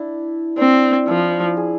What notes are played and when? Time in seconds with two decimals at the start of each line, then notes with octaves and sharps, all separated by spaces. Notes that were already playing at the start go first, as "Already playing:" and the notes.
Already playing: D4 E4
0.58 C4 D4
1.08 F3 E4
1.57 G#4